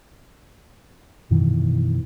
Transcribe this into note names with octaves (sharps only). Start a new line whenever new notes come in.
F#2 B2 D#3 E3